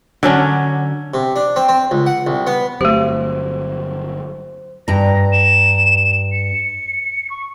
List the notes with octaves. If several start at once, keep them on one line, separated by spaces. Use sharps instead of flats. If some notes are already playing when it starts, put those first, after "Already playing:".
D3 F#3 C#4 D4
C3
D4
C4
C4
C#2
F#5
C2
B3
G1 F#3 A3 C4 G4 C5
G2 A#5 A#6
E7
C#7
C#6